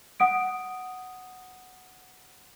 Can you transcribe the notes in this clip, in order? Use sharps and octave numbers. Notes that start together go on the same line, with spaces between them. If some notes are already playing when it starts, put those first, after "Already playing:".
F#5 D#6 D7